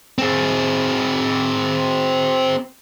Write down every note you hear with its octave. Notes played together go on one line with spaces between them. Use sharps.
C4 G#4